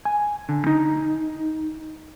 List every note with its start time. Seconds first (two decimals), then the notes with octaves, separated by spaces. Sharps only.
0.05 G#5
0.49 D3
0.67 D#4